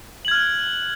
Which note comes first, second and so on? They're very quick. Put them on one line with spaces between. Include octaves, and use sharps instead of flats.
F#7 G#6 F6 F#6